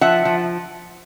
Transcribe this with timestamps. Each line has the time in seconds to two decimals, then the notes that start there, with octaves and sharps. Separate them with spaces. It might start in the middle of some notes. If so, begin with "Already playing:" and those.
0.01 F3 E5 F#5
0.25 F3